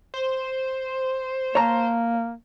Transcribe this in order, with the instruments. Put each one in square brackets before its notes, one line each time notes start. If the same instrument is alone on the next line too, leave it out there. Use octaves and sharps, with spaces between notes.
[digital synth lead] C5
[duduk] A#3 [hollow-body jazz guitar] C#5 A5 A#5